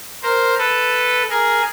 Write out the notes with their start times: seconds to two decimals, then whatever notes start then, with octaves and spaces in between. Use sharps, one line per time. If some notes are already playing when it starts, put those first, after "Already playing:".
0.23 A#4 C5
0.58 A4 B4
1.29 G#4 A#4